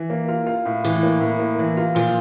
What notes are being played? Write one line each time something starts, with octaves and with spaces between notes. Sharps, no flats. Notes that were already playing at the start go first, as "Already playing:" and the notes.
Already playing: E3
A#3
F4
F4
A2
A2 E3
A#3
A2
A#3
E3
F4
A#2 F3